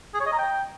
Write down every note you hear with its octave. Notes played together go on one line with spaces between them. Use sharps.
G#4
C#5
D#5
A#5
G5